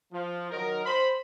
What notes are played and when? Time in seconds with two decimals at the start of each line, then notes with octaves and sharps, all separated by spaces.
0.12 F3
0.50 D#3 F#3 D#4 A#4
0.85 C5 B5